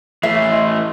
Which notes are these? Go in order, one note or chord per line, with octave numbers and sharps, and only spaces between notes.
E3 A3 E5 C7
D#5 C6